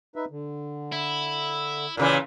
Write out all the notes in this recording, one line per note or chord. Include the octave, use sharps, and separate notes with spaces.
D#4 B4 E5
D3
E4
A#2 C#3 E3 D5